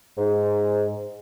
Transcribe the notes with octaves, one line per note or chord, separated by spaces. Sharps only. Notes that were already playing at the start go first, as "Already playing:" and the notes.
G#2